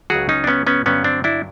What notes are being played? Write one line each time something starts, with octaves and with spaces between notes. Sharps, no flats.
C#2 C#3 F#3 F#4 G#4
C#4 D#4
D4
B3 C#4
B3 C#4
G2 D3 F#3 B3 C#4
C4 D4
D4 E4